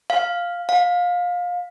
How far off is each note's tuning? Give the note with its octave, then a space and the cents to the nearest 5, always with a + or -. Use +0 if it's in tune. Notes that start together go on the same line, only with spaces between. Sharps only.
F5 +0
F5 +25